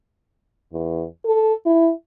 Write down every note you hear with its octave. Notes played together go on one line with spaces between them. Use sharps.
E2
A4
E4